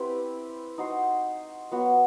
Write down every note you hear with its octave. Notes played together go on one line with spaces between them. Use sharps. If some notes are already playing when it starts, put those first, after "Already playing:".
Already playing: C4 E4 G4 B4
D#4 F#4 C5
F#3 B3 F#4